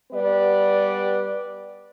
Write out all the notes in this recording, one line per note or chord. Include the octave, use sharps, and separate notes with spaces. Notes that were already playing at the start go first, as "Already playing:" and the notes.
G3 B3 B4 D5